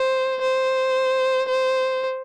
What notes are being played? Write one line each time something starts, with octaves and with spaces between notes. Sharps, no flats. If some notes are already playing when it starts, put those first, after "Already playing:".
Already playing: C5
C5
C5